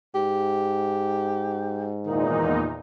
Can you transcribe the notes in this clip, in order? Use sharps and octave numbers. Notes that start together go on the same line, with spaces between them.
G#2 G4
E2 A#2 D#3 D#4